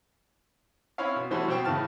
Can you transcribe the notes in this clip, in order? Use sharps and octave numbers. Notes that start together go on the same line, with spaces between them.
C4 C#4 E4 C#5 F5
B2
E3 G3 A3 C#4 F#4 C5
B2 F#3 C4 C5 G5 C#6
A2 C#3 E3 A5 F6